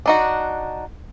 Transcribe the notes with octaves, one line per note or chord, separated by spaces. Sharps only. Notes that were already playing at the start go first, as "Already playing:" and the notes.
D4 D#4 F#4